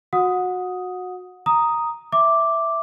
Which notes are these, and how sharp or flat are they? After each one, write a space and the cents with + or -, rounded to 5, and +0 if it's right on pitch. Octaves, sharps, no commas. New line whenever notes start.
F#4 -20 F#5 -25 D#6 +5
A#5 +0 D#6 +0
E5 +0 D6 +0